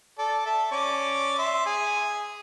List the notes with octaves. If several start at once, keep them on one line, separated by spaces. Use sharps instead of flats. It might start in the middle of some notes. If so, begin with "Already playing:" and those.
A4 D5
A4 E5
C#4 D5 D6
E5 C6
G#4 G#5